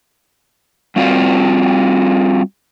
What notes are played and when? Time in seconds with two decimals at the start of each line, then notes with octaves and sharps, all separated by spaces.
0.96 G3 C4 F4 F#4 D5 F5